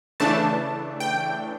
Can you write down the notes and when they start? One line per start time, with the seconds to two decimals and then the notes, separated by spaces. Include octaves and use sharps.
0.20 C#3 E3 A3 D4 A5
1.00 G5